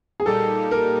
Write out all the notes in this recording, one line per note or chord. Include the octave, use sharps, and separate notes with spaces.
G#4
A#2 G3 A#3 D#4 G4 A4
A#4